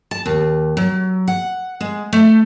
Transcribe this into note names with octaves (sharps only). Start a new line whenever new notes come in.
A5
D#2
F#3
F#5
G#3
A3